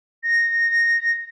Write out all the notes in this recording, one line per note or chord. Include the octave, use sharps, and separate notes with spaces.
A#6